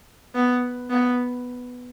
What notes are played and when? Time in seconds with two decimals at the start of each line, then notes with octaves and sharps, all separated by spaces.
0.35 B3
0.90 B3